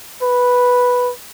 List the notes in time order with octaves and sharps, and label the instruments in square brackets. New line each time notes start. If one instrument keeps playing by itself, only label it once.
[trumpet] B4